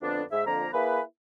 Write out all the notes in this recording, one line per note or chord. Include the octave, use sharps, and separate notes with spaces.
F2 D3 B3 D4
G#2 E5
F2 D3 F3 A#3 A#5
A#3 E4 G#4 B4